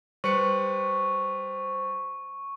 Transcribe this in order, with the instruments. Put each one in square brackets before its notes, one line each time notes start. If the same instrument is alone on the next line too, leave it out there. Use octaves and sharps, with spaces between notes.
[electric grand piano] G3 B4 C#7 [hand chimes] C5 [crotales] C#6